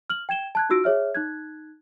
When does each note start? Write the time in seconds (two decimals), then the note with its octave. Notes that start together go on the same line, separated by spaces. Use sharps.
0.10 F6 F#7
0.29 G5 G#6 E7 G7
0.55 A5 F#6 G#6
0.69 D#4 F4 F#4 E6 A#6 D7
0.84 G#4 C#5 E5 F6
1.15 D#4 F#6 G#6